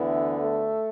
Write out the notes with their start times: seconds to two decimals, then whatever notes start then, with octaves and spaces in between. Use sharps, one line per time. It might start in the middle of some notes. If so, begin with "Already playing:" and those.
Already playing: D2 D3 E3 B3 E4
0.39 A3 A4